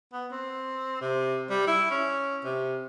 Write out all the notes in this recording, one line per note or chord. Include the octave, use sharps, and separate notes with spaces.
B3
C4
C3
G3
E4
C#4
C3